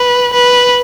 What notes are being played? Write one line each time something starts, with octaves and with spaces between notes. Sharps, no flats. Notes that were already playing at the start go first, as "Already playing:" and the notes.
Already playing: B4
B4